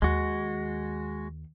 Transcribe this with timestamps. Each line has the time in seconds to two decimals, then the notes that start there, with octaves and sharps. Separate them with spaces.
0.02 D#2 G#3 F#4